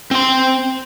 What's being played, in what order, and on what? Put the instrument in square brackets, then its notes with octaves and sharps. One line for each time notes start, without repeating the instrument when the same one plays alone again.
[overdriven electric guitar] C4 C6